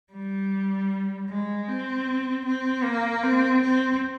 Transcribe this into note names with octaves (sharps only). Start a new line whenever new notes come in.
G3
G#3
C4
C4
A#3
C4
C4